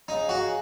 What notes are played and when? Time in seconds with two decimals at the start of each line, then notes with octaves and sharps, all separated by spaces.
0.08 D#4 G#4 C#5 F5 G#5
0.29 F#4